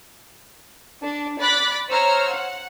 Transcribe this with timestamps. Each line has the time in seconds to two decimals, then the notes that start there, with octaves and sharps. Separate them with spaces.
1.02 D4
1.39 D5 B5 F#6 A6 B6
1.88 C5 C#5 A#5 E6 F6
2.30 F#5